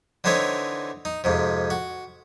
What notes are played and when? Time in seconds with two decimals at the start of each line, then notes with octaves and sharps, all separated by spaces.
0.24 D3 E3 C4 D#4 E4 C#5
1.05 D#4
1.24 F2 G#2 C3
1.70 F#4